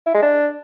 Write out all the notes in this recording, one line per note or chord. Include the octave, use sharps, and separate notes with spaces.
E4
G#3
D4